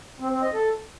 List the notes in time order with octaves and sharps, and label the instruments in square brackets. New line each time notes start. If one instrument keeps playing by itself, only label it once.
[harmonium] C4
C4
D#5
A4